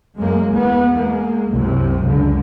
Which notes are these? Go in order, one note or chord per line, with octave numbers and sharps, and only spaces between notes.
F#2 G#3 A#3
E2 B3
G#3 A#3
C2 F#2 C3
C#2 D3